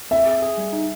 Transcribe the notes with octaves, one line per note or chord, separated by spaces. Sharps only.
C4 E5
G#4
G#4
G3
D#4